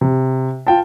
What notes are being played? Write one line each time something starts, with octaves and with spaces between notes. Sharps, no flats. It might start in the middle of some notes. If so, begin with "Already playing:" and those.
C3
F4 G5 A5